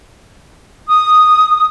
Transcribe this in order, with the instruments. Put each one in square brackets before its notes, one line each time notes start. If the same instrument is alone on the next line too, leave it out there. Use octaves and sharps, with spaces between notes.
[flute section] D#6